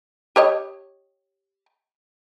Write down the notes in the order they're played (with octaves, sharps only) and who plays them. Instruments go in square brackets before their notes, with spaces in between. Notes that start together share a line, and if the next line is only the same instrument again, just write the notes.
[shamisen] G4 C#5 D#5